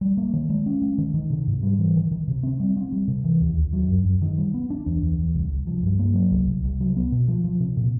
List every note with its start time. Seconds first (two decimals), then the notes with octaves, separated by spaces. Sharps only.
0.01 G3
0.17 A#3
0.33 D#3
0.49 G#3
0.66 C#4
0.82 G#3
0.98 D#3
1.14 D#3
1.30 C3
1.47 G#2
1.63 G3
1.79 E3
1.96 D#3
2.11 D#3
2.28 C3
2.43 C4
2.60 G3
2.76 C4
2.92 G3
3.08 C3
3.24 E3
3.41 D#2
3.57 D#2
3.73 F#3
3.88 F#2
4.05 F#2
4.22 D#3
4.37 G3
4.54 B3
4.70 D4
4.86 E2
5.02 E2
5.19 E2
5.35 C2
5.50 C2
5.67 F3
5.83 G2
5.99 A#3
6.15 F#3
6.31 C2
6.48 C2
6.64 C2
6.80 F#3
6.96 B3
7.12 B2
7.28 F3
7.44 F3
7.60 C3
7.77 A#2